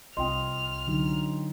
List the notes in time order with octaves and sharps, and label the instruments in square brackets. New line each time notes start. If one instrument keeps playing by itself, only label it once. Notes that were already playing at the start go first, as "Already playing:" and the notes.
[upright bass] C2 [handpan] C4 F4 D#5 [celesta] G5 C6 [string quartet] F6
[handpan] D3 F#3 D#4